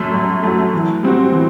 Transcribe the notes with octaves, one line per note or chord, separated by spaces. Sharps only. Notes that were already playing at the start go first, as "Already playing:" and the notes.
Already playing: F#2 F#3 A3
F#2
F#3 A3
E3
G3 C4 F#4
E3